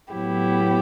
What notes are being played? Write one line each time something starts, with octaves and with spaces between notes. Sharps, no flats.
A2 F#3 B3 E4 G4